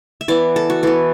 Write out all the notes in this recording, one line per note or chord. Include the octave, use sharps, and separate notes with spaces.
E5
E3 B3 D5
A4
F#4
E3 B3 A4